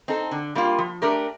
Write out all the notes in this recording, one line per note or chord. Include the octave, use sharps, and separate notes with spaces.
C4 D#4 A4
D3
G3 A#3 F4
F3
A3 D4 G4 A#4